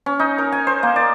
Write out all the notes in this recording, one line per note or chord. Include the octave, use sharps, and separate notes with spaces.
C#4
D#4
A#4
G#5
C5
A#3
D5